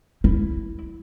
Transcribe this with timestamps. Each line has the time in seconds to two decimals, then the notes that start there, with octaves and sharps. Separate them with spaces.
0.24 E4